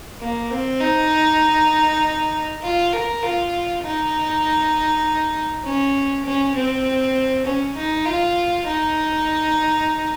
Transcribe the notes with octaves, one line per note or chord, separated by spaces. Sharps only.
A#3
C4
D#4
F4
A#4
F4
D#4
C#4
C#4
C4
C#4
D#4
F4
D#4